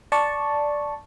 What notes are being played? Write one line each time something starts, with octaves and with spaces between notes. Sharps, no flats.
D5 A5 C#6